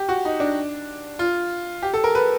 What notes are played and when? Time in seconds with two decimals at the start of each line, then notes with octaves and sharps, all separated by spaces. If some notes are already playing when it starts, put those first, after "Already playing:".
Already playing: G4
0.09 F#4
0.25 D#4
0.40 D4
1.19 F4
1.82 G4
1.94 A4
2.04 A#4
2.15 B4